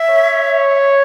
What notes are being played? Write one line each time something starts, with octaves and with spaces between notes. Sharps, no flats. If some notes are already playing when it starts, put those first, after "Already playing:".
Already playing: E5
C#5